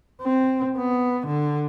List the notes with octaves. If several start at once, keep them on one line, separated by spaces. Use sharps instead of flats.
C4
B3
D3